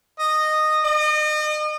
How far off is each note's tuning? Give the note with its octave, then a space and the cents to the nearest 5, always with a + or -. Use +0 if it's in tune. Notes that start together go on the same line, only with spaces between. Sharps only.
D#5 -10
D#5 -35